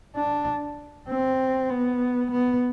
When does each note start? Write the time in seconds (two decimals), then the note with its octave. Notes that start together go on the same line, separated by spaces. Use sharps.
0.16 D4
1.09 C4
1.70 B3
2.31 B3